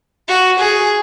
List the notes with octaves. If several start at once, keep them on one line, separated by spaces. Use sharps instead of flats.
F#4
G#4